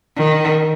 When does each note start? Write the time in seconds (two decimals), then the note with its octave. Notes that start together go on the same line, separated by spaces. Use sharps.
0.16 D#3